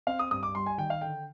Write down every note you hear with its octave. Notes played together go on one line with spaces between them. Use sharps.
C4 F5
D#6
G2 D#6
D6
G3 C6
G#5
D#3 G5
F5
D3 G5